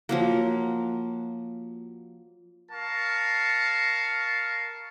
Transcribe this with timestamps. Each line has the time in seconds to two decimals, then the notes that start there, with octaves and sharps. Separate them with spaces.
0.09 F3 F#3 A#3
2.72 A#4 F5 A5 C#6